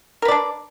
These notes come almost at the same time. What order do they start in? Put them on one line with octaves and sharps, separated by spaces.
A#4 B4 D5 D4